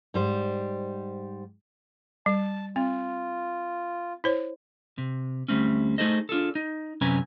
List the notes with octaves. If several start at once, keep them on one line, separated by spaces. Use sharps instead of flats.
G#2 G3 C5
G3 A5
C4 F4
E4 C5 C#5
C3
D2 G3 A3 C4 C#4
A3 D#4 G#4 A4 C5 D#5
D4 F4 G#4 A4
D#4
F#2 C3 C#4 B4 G#5 A#5